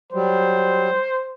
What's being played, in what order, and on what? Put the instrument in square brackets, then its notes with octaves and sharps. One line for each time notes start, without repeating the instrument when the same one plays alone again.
[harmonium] F#3 G3 [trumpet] C5